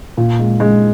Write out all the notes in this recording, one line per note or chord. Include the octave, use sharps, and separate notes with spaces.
A#2
G#3
G#3